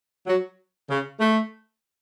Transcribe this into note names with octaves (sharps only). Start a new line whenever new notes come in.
F#3
C#3
A3